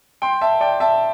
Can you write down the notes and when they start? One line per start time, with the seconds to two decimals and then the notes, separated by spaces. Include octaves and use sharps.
0.22 G5 C6
0.41 E5 A5
0.60 D5 G5
0.80 E5 A5